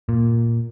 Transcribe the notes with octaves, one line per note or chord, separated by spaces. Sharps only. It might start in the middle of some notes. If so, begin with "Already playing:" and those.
A#2